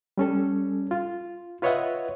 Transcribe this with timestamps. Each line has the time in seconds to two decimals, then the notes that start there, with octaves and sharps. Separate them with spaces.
0.18 G3 C#4 A4
0.91 F4
1.62 F4 B4 C#5 D#5 E5 F#5